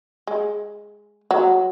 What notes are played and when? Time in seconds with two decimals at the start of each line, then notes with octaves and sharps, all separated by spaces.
0.27 G#3
1.31 F#3